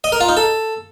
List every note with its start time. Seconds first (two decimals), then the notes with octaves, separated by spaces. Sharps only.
0.04 D#5
0.12 A#4
0.20 F4
0.29 D#4
0.37 A4